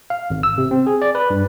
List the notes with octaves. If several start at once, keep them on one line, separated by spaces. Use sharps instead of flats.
F5
G#1
E6
C3
C4
G#4
D5
B4
G2